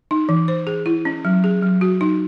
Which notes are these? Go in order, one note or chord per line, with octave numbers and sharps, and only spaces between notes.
D#4
E3
C5
G#4
E4
C#4
F#3
G#4
F#3
F#4
D#4